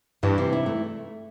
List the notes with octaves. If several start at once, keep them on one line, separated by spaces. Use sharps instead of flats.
G2 E3
C3
E4
A3